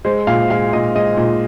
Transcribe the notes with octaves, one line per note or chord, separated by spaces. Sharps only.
G#3 C5
A#2 F5
G#3 F5
A#2 D#5
G#3 D#5
A#2